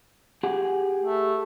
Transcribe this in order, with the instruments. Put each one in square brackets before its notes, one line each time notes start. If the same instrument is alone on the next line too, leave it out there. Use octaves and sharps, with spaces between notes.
[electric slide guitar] G4 G#4 F#5
[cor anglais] A3